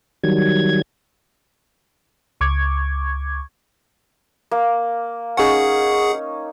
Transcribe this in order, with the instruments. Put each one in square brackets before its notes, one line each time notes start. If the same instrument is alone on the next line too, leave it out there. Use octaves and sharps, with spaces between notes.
[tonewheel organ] D#3 F#3 G3 G#6
[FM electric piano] C#2 C#6 D6 G#6
[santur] A#3
[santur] C#4 D#4 [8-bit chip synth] G#4 F#5